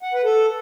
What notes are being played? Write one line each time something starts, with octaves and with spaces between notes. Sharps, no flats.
F#5
B4
A4